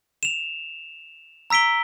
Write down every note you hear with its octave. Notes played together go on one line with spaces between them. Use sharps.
E7 F7
A#5 E6 B6 D7 G7